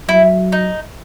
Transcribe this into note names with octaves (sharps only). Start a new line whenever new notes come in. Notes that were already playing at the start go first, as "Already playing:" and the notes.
F#3 E4
D#4